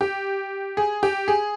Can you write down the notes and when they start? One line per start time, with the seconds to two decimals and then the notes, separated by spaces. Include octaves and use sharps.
0.01 G4
0.77 G#4
1.03 G4
1.28 G#4